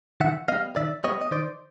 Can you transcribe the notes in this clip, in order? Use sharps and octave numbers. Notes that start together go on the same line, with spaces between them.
D#3 E5 F#5
G3 B3 D#5 F5
D#3 D5 E5
G3 B3 C#5 D#5
D#5
D#3 C5 D5